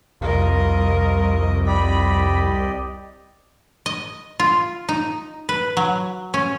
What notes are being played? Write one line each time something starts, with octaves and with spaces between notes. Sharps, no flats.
C2 F2 F4 A#4 D#5
G4 D5 D#5 B5
D#5
F4
D#4
B4
F#3
C#4